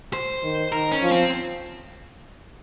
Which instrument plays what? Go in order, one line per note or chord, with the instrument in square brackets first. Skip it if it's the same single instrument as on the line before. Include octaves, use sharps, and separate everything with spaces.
[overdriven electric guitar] C5
[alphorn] D#3
[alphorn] D#3 [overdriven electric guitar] A#4
[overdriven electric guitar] C#4
[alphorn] F3
[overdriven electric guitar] C4